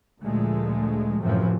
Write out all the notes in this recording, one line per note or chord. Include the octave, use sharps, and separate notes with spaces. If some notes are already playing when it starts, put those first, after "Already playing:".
D2 A#2 D3 F3 G#3 A3
F#2 A2 C3 E3 F3